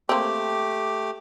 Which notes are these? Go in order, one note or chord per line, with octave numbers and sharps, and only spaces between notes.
A3 A#3 C4 G4 D6